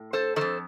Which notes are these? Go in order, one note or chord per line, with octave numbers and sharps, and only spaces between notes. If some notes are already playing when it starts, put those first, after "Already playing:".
Already playing: A2
A4 C5
F2 D#3 A4 C5